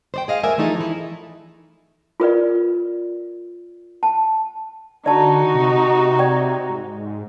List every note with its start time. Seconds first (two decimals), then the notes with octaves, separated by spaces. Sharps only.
0.14 C5 D5 G5
0.28 G#4 D#5 F5
0.43 F#2 A3 A#4 D5 E5 G#5
0.58 E3 F3 A3 D#4 G#4 A4
0.81 E4
2.20 F4 A#4 B4 D5
4.03 A5
5.06 D3 D#4 F#4 D5 A5
5.55 C3
6.19 D5 G5
6.69 G#2